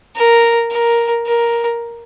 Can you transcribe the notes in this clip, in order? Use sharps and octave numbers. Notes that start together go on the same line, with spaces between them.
A#4
A#4
A#4